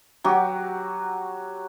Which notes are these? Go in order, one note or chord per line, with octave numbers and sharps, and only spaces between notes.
F#3 F#4 G4